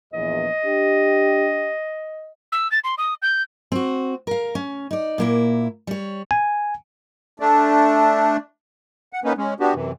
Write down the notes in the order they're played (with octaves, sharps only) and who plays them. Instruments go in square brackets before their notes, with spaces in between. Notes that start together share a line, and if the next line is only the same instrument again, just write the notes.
[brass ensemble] A#1 E2 [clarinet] D#5
[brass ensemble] D4 G4
[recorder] E6
A6
C6
D#6
G6
[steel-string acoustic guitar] C4 F#4
A#4 F5
C#4
D#4 D5
A#2 A#3 E4
G3 C#5
[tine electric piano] G#5
[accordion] A3 D4
F#5
A#3 B3 C#4 D#4 B4
G#3 C#4
B3 D4 F#4 G4
F#2 C3 E3